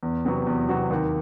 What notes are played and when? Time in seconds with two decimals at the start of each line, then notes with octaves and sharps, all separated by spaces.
0.03 E2
0.25 C3 F#3 B3 F#4
0.47 E2
0.69 C3 F#3 B3 F#4
0.90 D#2